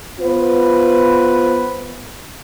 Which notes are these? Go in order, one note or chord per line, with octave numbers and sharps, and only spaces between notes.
B3 F4 B4 C5